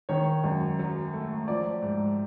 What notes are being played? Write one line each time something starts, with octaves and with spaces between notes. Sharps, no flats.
D#3 C#5
F#2
F#3
A3
F3 D5
G#2